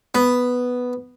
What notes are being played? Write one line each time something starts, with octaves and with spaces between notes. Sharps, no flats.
B3